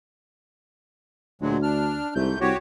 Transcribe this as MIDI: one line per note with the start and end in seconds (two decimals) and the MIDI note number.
1.42 1.99 38
1.42 1.57 46
1.42 1.57 54
1.42 1.57 56
1.63 2.14 62
1.63 2.14 89
2.15 2.33 36
2.15 2.39 44
2.15 2.39 57
2.15 2.39 91
2.41 2.52 36
2.41 2.57 66
2.41 2.57 67
2.41 2.57 73